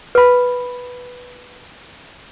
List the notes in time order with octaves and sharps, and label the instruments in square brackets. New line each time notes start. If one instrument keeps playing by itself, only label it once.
[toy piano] B4 B5